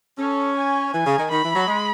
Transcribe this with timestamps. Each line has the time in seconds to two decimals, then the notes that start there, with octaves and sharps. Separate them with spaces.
0.18 C#4 A4
0.56 G#5
0.93 E3 G#5
1.06 C#3
1.18 D#3
1.30 D#3 B5
1.43 E3
1.55 F#3
1.67 G#3